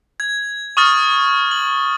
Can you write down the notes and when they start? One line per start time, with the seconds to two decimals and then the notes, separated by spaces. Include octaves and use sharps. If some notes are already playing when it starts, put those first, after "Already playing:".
0.20 G#6
0.77 C#6 D#6 F6 A6
1.51 F#7